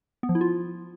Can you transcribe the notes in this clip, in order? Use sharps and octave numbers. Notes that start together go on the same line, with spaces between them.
B3
F3
E4
F4